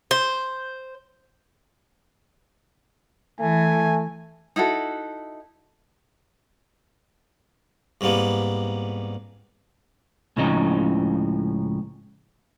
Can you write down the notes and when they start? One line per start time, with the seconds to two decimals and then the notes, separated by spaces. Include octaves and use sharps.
0.11 C5
3.40 E3 A3 G#5
4.56 D#4 E4 F#4 A4
8.01 C2 G#2 G3 A#3 B3
10.37 C#2 A2 C#3 F3 C4 D#4